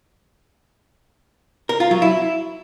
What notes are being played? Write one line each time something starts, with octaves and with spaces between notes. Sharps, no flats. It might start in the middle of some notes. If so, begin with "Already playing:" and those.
A#4
F4
F#3
E4